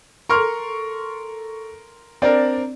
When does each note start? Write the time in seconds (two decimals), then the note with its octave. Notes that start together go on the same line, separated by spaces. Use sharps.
0.29 A4 A#4 C6 C#6 F6
2.22 C4 D4 A#4 D5